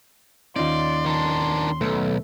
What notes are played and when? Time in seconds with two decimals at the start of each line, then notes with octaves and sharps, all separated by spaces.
0.56 D#2 C#4 D#4 F4 D5 C6
1.06 D#3 D4
1.81 B1 A3